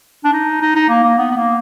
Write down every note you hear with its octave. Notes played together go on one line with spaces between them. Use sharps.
D4
D#4
D#4
D#4
A#3
A#3
B3
B3
A#3